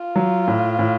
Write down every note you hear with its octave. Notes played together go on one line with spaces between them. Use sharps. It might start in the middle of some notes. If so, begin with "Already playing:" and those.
Already playing: F4
F#3
A2
A2